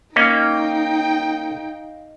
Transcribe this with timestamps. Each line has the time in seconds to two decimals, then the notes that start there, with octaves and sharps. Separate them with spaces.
0.16 A#3 C#4 D#4 D#5 F5 G5